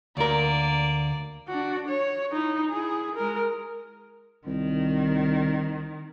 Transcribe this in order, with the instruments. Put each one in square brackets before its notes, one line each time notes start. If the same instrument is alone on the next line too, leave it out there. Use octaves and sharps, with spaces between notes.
[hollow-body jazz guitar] D2 A#4 [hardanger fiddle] A#3 D5
[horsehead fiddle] D4 F#4
C#5
D#4 E4
E4 G#4
G#3 A#4
[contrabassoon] C2 [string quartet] D#3